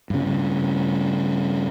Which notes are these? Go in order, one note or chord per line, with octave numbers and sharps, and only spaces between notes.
G2 C#3